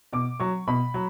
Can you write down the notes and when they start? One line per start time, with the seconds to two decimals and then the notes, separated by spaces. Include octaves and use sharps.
0.13 B2 D6
0.40 F#3 C#6
0.67 B2 B5
0.94 F#3